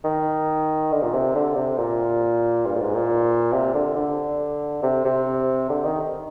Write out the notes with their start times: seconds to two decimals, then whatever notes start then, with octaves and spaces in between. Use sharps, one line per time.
0.04 D#3
0.92 D3
1.03 A#2
1.13 C3
1.35 D3
1.56 C3
1.78 A#2
2.65 G2
2.76 A#2
2.80 G#2
2.94 A#2
3.52 C3
3.74 D3
3.96 D3
4.83 C3
5.05 C3
5.70 D3
5.84 D#3